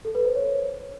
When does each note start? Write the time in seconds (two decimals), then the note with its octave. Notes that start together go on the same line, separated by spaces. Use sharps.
0.05 A4
0.15 B4
0.25 C5
0.35 C#5